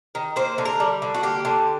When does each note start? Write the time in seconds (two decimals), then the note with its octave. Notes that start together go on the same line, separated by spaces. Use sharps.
0.15 D#3
0.36 A#3 C5
0.58 D3
0.65 A#4
0.80 G3
1.02 D3
1.14 F#4
1.23 A#3 G4
1.45 D3